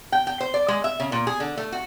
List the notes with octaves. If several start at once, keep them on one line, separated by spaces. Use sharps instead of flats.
G5
G5
C5
D5
G#3
E5
C#3
A#2
G#4
D3
A3
F#4